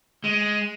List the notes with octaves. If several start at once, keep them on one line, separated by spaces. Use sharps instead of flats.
G#3